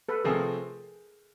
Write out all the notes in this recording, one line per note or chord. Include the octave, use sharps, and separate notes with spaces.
A4 B4
C3 F3 A3 C4 G#4 A#4